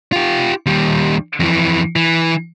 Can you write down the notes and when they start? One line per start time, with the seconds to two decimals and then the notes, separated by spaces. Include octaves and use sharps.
0.12 F4 G4
0.66 D#2 G3
1.40 F2 E3
1.96 E3